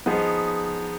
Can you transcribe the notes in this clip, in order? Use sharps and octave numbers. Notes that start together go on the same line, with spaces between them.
F3 B3 D#4 G#4